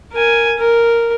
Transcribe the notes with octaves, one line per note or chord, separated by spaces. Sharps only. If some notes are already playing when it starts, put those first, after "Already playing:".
A#4 G#5
A#4